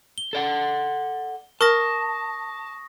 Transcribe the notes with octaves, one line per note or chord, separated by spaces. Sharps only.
G7
A4 D5 F#5
A#4 A5 C#6 D#6 A#6